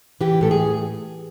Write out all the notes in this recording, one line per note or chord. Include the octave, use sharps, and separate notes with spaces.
E3 G4
A2 A4
G#4